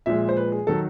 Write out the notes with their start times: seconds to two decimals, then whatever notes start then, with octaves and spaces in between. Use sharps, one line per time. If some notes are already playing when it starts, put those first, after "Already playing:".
0.06 A#2 F3 G#3 E5
0.29 C5
0.37 B4
0.52 G#4
0.67 D#3 F#3 A4